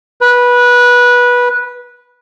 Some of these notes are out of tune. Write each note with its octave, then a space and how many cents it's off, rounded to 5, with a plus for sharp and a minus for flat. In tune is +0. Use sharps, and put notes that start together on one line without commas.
B4 -15